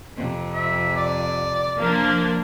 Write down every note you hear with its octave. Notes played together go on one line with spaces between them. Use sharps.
F2 C3
E5
D5
F3 A#3 D4